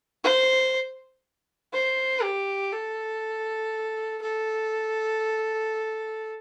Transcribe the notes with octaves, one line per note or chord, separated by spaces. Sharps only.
C5
C5
G4
A4
A4